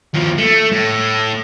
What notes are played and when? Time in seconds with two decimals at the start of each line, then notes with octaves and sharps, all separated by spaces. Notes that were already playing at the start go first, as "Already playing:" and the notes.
0.14 D#2 F3
0.38 A3
0.72 A2